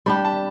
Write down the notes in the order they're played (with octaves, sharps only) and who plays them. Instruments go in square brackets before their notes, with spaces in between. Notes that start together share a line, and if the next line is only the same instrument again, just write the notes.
[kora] G3 D4 G4 [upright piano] B5
[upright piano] A5